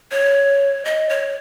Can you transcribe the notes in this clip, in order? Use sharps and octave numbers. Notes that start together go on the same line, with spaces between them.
C#5
D#5
C#5